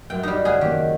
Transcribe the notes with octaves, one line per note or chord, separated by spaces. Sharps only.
F#2 E5 G5
G3 D#4
C#3 G#4 E5 F#5
D#3 A#3 G4